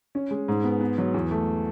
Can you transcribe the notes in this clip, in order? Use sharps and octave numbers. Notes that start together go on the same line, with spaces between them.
C#4
G#3
G#2
B3
B3
F#3
E2
A3